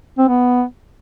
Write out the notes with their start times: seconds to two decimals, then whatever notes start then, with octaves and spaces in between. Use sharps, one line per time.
0.18 C4
0.28 B3